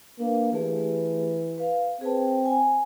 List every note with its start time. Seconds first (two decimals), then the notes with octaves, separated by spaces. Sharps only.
0.20 A#3 D4 B4
0.53 E3 A3 G4 G#4
1.58 B4 F5
2.01 C4 G#4 B4 A5
2.46 G#5